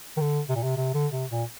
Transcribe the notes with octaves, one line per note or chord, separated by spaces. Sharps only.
D#3
D3
C3
A#2
C3
C3
D3
C3
A#2